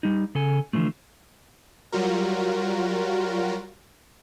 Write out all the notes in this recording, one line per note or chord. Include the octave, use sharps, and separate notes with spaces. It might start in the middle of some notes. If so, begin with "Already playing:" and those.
G3 D#4
C#3 A4 G#5
D3 E3 F3 A3
F#3 G3 F4 F#4 A#4